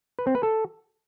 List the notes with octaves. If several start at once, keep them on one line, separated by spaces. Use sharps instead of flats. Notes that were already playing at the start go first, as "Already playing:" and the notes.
B4
C4
B4
A4